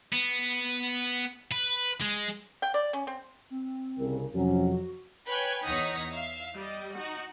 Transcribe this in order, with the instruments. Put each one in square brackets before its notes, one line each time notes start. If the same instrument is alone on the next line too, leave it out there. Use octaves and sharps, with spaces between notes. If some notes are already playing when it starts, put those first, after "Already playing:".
[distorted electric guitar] B3
B4
G#3
[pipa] G5
D5
C#4
C4
[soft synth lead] C4
[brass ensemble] C2 C#3 A#4
[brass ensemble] F2 C3 F#3 [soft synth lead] C#4
[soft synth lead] F#4
[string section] B4 C#5 G5 G#5 F#6 G#6
E2 D#4 C#5 F#5 D#6 B6
E5 F5
G3 D#5
D#4 F#4